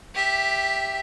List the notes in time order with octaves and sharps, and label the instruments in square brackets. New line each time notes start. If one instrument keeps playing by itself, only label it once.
[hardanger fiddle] G4 E5